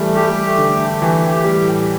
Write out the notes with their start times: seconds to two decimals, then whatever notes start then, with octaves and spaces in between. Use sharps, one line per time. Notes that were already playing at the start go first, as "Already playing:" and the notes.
Already playing: E3 G3 A3
0.14 G3 G4
0.43 A3
0.58 D3
0.72 A3
1.02 E3 G4
1.30 G4
1.44 G3
1.58 A2